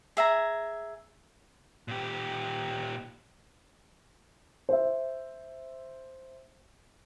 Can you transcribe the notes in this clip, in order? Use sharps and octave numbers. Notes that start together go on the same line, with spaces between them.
G#4 E5 G#5 A#5
A#2 G4
C5 E5